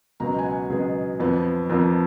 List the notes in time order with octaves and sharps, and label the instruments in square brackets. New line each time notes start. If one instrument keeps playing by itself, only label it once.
[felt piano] C#2 B2 F#3 B3 A#5
G#5
F#5
C#2 B2 F#3 B3 G#4
F2 F3 B3
F2 F3 B3 A#4